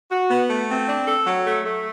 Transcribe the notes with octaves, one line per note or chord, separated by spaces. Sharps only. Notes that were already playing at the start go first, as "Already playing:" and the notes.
F#4
B3
A3
C4
D4
A4
F#3
A3
A3